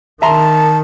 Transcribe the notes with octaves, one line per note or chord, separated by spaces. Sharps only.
D#3 E5 A5 A#5 C6